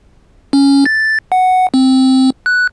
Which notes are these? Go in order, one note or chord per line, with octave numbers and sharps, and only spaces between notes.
C#4
A6
F#5
C4
F#6